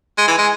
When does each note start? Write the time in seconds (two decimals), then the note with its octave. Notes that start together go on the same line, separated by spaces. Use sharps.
0.18 G#3
0.28 E3
0.38 G#3